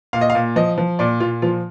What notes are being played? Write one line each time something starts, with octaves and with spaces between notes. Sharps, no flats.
A#2 F5
D#5
F5
A#2
F3 D#5
F3
A#2 D5
A#2 F4
F3 F4